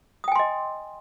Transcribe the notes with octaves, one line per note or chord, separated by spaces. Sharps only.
D#5 G5 G#5 C6 D#6